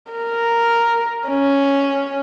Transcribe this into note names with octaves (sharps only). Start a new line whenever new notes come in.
A#4
C#4